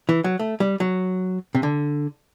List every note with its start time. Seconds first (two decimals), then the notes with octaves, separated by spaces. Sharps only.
0.09 E3
0.24 F#3
0.39 A3
0.60 G3
0.80 F#3
1.55 C3
1.63 D3